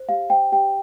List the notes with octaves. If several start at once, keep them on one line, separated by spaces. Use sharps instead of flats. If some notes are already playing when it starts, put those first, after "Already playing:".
Already playing: C5
G4 F5
C5 G5
G4 G5